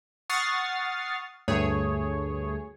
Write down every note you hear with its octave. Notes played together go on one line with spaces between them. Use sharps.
F#5 C#6 D#6 F6 A6 C7
D2 G2 A3 G#4 C#5